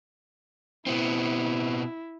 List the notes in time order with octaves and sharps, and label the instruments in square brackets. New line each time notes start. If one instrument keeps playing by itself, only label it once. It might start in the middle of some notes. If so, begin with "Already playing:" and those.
[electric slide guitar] B2 B3 C4 [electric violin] E4